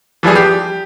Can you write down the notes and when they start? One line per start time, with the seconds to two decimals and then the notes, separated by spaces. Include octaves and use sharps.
0.23 E3 F3 G3 G#4
0.35 G4